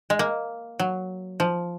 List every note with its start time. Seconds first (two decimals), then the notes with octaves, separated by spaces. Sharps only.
0.10 G#3
0.19 A#3
0.80 F#3
1.40 F3